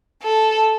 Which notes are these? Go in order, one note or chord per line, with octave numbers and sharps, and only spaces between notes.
A4